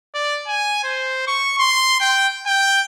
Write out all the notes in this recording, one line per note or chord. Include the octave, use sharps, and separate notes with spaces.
D5
G#5
C5
C#6
C6
G5
G5